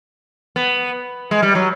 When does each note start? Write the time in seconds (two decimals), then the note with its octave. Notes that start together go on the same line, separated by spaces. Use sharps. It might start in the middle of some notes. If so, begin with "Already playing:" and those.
0.56 B3
1.31 G#3
1.43 G3
1.55 F#3